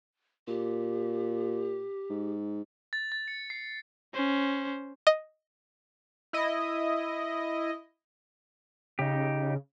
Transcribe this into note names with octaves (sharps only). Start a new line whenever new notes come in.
A#2 G4
G#2
A6
A6
C#7
C7
C#4 C5
D#5
E4 D#5
C#3 D#4 G4